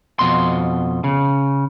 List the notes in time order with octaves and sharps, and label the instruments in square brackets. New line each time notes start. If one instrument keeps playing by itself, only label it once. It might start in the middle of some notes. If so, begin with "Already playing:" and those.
[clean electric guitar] F2 G#2 B2 C6
C#3